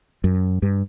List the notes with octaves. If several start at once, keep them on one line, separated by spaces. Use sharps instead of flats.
F#2
G2